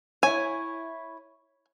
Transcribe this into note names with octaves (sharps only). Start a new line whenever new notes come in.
E4 C#5 G#5